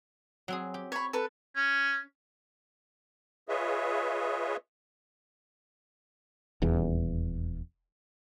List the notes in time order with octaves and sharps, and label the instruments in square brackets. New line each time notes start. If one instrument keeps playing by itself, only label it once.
[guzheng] F#3 C4 G#4
G4
[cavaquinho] C#5 B5
A4 B4
[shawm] C#4
[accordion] F4 G#4 B4 C#5 D#5 E5
[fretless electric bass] D#1 E2